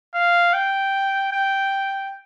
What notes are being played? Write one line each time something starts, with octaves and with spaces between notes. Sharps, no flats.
F5
G5
G5